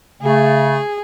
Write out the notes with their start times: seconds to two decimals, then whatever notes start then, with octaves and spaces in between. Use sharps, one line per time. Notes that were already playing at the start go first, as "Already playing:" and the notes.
0.22 C#3 A3 G#4